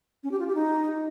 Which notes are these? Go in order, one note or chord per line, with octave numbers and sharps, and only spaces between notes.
C#4
G4
F4
G4
D#4